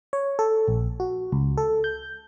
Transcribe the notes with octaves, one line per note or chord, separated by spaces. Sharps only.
C#5
A4
A#1
F#4
C#2
A4
G6